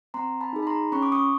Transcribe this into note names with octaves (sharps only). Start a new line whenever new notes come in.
C4 A#5 C6
A5 B5
D#4 G#4
B5
A#5 C6
C#4 B5 C#6
D6
C#6 D#6